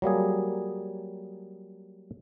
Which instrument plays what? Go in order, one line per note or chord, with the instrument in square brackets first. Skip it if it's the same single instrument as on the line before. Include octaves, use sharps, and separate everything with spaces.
[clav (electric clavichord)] F#3 G3 A#3 G#4